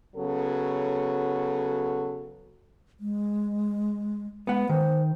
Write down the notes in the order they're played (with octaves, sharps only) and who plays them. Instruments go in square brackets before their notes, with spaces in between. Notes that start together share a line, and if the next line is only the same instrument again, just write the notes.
[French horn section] C#3 F#3 B3 A4
[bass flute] G#3
[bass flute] G#3 [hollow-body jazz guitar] B3 F#5
[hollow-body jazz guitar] D#3 [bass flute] C5